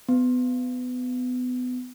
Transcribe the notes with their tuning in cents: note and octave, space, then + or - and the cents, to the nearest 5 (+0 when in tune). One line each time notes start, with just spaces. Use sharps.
B3 +25